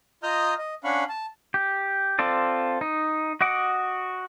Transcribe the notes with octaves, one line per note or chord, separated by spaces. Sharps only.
F4 D#5 A#5 D#6 F6 G6
D#5
C#4 D4 F5 F#5 B5 C#6
A5
G4
C4 F4 A4 D5
D#4
F#4 D#5 F#5 D6